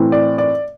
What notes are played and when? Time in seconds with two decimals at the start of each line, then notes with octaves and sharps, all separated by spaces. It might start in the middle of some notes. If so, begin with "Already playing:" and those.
Already playing: A2 E3 C4
0.12 D5
0.38 D5